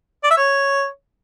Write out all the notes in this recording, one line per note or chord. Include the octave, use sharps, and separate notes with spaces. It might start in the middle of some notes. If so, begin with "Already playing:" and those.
D5
E5
C#5